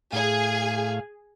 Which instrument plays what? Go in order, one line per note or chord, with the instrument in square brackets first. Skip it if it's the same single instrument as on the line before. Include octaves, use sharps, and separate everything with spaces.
[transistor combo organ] A2 F5 [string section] G#4